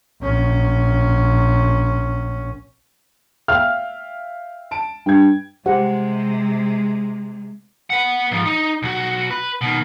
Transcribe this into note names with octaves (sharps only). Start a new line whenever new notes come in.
A#1 C#4
E5 F5 G5 F6
A5 D7
G2 G5 G#6
C3 G#3 G4 C5 F#5
B4 F#5
G#2 F3
D#4
B1 F#4
B4
B2 D#3